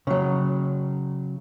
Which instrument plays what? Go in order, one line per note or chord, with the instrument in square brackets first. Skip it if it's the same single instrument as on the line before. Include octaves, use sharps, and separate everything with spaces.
[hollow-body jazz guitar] C#3 F#3